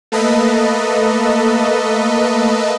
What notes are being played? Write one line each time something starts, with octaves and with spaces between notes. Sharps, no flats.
A3 A#3 A4 B4 D#5